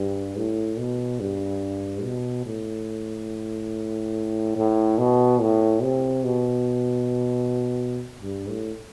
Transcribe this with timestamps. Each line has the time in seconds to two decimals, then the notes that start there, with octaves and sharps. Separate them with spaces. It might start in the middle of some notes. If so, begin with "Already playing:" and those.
Already playing: G2
0.37 A2
0.78 B2
1.20 G2
2.04 B2
2.46 A2
4.56 A2
4.98 B2
5.41 A2
5.83 C3
6.24 B2
8.21 G2
8.49 A2